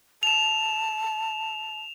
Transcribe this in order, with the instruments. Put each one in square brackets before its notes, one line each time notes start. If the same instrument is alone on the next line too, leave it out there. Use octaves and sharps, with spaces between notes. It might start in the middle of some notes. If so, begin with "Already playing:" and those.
[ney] A5 [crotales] E7 F7